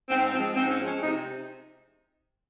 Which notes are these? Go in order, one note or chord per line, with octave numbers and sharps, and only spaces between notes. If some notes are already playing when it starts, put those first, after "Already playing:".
G#2 C4
F3 G#3 C4
G#2 C4
C#4
F3 G#3
C#4
C3 D#4